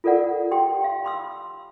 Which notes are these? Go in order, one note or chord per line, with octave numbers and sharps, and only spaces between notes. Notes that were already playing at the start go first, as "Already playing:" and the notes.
F4 A4 A#4 D5 F#5
G4 G5 C6
F5
B5 C6 E6